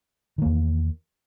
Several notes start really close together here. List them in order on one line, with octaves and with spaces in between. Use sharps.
D#3 A#3 E2